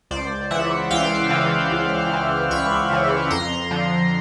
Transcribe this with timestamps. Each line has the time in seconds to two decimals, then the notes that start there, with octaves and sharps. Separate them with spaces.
0.11 C#2 C5 D5
0.51 C#3 E3 E5 F#5
0.91 C#2 F5 G5
1.31 C#3 E3
1.71 C#2
2.11 C#3 E3
2.50 C#2 B5 C#6
2.91 C#3 E3
3.31 F2 A#5 C6
3.71 D3 F3